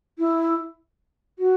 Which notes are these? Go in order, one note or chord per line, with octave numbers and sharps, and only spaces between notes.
E4
F#4